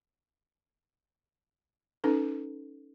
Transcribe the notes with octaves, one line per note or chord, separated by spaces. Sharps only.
C#4 D#4 A4 B4